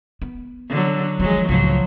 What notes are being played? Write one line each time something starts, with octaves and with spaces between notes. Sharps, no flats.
B3
D3 F#3
D#3 F3 F#3 G#3
C#2 A2 F3 F#3